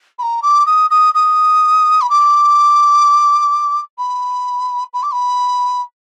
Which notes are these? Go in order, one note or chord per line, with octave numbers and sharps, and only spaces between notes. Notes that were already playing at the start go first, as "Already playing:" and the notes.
B5
A#5
D6
D#6
D#6
D#6
B5
D6
B5
B5
D6
B5